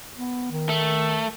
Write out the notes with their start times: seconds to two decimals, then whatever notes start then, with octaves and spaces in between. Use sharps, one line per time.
0.17 B3
0.51 D#3
0.69 A3